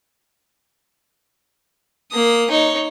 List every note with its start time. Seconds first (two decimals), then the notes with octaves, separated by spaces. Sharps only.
2.12 A#3 D#6
2.51 D#4 C#5